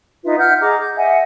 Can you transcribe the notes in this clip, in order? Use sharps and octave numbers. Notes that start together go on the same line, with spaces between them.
D#4 F4 B4 E5
E5 F#5 F6 G6
G#4 D#5 A#5 D6
G6
D#5 E5 F#5 G#5